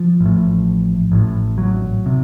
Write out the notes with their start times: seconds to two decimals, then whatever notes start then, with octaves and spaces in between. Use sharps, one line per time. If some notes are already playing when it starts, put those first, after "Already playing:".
Already playing: F3
0.21 A1 A2
1.12 A1 A2
1.58 F#3
2.06 C3